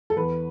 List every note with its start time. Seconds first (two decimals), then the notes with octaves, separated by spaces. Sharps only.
0.10 A4
0.16 E2 B4